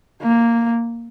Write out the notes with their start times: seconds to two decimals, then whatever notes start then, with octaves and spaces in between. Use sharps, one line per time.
0.22 A#3